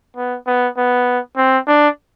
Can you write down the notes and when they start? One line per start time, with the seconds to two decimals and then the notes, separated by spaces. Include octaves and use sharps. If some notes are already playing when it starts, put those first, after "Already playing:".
0.16 B3
0.47 B3
0.77 B3
1.37 C4
1.67 D4